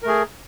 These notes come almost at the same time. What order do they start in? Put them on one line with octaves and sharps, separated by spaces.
A#4 A3 G#4